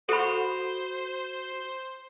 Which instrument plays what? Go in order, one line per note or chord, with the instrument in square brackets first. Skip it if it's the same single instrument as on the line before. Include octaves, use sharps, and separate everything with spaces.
[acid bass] F#4 [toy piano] A4 B5 [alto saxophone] C5